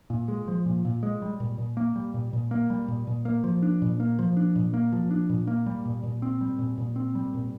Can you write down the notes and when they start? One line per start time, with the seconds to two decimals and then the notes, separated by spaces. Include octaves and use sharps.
0.10 A#2
0.28 G#3
0.48 F3
0.66 A#2
0.85 A#2
1.03 G#3
1.22 G3
1.40 A#2
1.58 A#2
1.77 A#3
1.96 G3
2.14 A#2
2.33 A#2
2.51 A#3
2.70 G3
2.88 A#2
3.07 A#2
3.25 A#3
3.44 F3
3.63 D4
3.82 A#2
4.00 A#3
4.19 F3
4.37 D4
4.56 A#2
4.74 A#3
4.92 F3
5.11 D4
5.30 A#2
5.47 A#3
5.66 G3
5.85 A#2
6.03 A#2
6.22 C4
6.41 G3
6.59 A#2
6.78 A#2
6.96 C4
7.15 G3
7.34 A#2